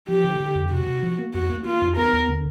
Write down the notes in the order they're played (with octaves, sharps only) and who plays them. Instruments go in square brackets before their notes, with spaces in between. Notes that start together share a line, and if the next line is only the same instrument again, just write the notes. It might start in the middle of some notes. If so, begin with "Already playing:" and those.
[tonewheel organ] F3 [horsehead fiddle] G4
[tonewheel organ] D3
D3
F2
[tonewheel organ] C3 [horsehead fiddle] F#4
[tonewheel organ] C3
F3
A#3
[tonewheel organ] F2 [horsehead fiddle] F#4
[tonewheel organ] A#3
[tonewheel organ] A#3 [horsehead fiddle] F4
[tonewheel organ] F2
[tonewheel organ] B3 [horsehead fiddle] A#4
[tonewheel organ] D#2
D3